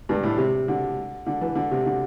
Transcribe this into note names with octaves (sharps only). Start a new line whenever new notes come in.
G2
A2
C3
D3
D3
E3
D3
C3
D3